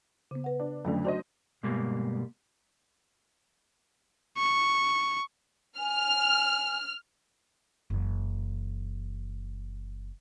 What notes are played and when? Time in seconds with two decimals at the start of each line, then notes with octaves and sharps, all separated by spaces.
0.31 C#3 B3
0.44 B4 F#5
0.60 D4
0.85 F2 D3 F#3 A3 C#4
1.05 D4 F#4 C5 D#5
1.63 D2 G2 B2 G3 G#3 A#3
4.38 C#6
5.79 G#5 F6
7.90 F#1 E3